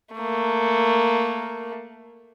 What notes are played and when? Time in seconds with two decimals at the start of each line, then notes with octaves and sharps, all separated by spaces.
0.15 A3 A#3